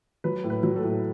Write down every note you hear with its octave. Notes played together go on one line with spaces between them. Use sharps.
F#3 B4
A2
B4
F#3
A4
A2